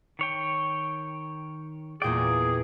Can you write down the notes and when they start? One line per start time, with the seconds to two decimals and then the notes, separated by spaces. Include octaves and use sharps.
0.19 D#3 C#5 G5
2.02 E2 A#2 A#3 G#4 D5 G5